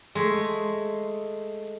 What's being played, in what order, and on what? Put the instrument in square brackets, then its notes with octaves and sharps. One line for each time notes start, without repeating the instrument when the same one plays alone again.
[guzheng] G#3 A3